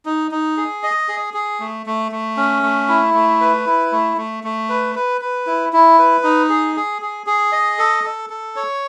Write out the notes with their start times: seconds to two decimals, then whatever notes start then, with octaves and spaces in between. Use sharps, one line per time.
0.06 D#4
0.31 D#4
0.57 G#4
0.83 D#5
1.08 G#4
1.34 G#4
1.60 A3
1.86 A3
2.12 A3
2.37 C#4
2.63 A3
2.89 E4
3.14 A3
3.41 B4
3.66 E4
3.92 A3
4.17 A3
4.44 A3
4.69 B4
4.95 B4
5.21 B4
5.47 E4
5.73 E4
5.99 B4
6.23 D#4
6.49 G#4
6.76 G#4
7.02 G#4
7.27 G#4
7.52 D#5
7.79 A4
8.04 A4
8.30 A4
8.56 C#5